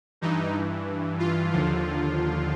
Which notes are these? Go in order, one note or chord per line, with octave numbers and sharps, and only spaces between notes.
G2 E3 D#4
F4
D#2 D3 F3